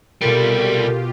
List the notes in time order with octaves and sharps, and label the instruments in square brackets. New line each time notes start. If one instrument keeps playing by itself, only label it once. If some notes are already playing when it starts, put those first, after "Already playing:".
[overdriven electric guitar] C2 G3 [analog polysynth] B2 F4 G4 [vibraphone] A4 A#4